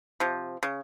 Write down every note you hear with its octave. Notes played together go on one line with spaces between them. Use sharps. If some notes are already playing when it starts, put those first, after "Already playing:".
C3 F3
C#3